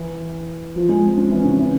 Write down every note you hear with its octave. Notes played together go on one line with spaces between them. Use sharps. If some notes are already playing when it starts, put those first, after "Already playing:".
Already playing: E3
F3
G#3
C4
C#4
E3
C#3
E3